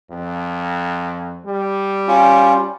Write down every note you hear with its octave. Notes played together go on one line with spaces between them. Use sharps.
F2
G3
C#4 F4